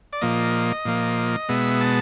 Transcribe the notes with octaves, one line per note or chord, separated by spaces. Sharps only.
D5
A#2 F3 A#3 D#5
A#2 F3 A#3
B2 G#3 B3 E5
A5